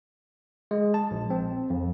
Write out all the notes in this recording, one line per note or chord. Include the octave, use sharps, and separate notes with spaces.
G#3
A5
A#1
C4
F2